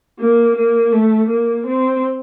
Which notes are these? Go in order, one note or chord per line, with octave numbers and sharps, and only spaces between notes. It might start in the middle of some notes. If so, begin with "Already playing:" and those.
A#3
A#3
A3
A#3
C4